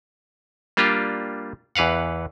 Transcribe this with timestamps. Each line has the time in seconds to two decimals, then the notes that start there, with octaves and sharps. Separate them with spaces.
0.77 G3 A#3 D4 F4 G4
1.75 E2 E3 B4 F5 F#5